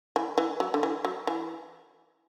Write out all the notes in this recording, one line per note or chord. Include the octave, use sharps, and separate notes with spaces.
E3
E3
F#3
D3
E3
F#3
E3